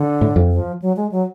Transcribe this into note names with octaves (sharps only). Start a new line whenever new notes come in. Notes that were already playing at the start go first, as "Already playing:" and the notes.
Already playing: D3
A2
F2
F3
F#3
G#3
F#3